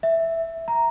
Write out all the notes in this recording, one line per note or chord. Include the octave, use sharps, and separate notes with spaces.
E5
A#5